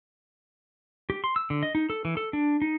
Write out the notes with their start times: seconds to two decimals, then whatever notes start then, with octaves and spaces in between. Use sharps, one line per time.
1.10 G4
1.24 C6
1.36 E6
1.50 D3
1.63 D#5
1.75 D#4
1.90 A4
2.05 E3
2.17 A4
2.33 D4
2.62 D#4